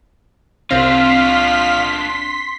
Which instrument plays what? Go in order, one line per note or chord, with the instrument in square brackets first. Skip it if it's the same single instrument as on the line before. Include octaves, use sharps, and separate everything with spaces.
[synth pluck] C2 C4 [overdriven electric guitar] D4 F4 [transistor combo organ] F5 [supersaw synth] C6 B6